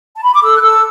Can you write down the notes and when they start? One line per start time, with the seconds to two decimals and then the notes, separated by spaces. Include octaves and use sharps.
0.15 A5
0.24 B5
0.33 D6
0.42 A4 E6
0.56 F#6
0.62 A4 E6